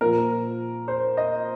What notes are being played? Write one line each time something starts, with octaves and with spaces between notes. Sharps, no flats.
A#2 F3 A#3 A#4
C5
D#5